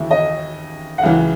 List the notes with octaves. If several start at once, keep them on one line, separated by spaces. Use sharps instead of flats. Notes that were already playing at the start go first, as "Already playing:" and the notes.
Already playing: D#2 C#3 E3 E5
D#5
F#5
C#2 C#3 E3 F5